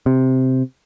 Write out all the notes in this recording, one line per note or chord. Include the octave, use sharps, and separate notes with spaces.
C3